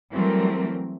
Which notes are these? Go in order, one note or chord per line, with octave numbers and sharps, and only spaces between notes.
E3 F#3 G3 A3 C4 A#4